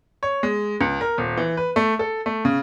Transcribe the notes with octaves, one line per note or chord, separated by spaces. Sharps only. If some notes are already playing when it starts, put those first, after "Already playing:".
C#5
G#3
C#2
A#4
D#1
E3
B4
A3
A4
A3
C#3